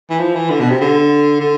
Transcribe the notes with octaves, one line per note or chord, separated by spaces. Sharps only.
E3
F3
E3
D3
B2
C3
D3
D3